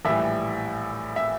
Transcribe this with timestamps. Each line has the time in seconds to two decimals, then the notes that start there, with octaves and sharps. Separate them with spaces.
0.05 A#1 A2 E3 G3 E5
1.16 E5